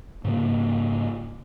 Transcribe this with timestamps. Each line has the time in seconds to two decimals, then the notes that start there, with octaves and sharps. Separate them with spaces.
0.24 G#2 C#3 A#3